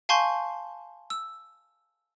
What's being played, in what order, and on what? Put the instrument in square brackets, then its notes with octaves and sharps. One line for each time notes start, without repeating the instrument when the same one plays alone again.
[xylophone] F5 G#5 A5 C6 C#6 G6
E6